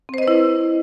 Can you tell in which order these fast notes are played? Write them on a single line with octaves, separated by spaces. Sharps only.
C4 C5 D#5 B4 E4